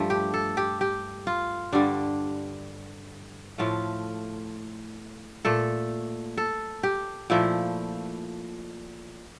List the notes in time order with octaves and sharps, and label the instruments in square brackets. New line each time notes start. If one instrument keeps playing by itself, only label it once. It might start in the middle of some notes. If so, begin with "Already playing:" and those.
Already playing: [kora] G2 F3 A3
G4
A4
G4
G4
F4
G2 D3 G3 D4
A2 F3 A3 F4
A#2 A3 A4
A4
G4
A#2 F3 A3 E4